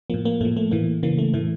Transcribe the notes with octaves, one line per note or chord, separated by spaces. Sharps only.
A2 F3 A#3
A#3
A2 F3 A3
A3
A2 E3 A#3
C#3 E3 A#3
A3
A2 E3 A3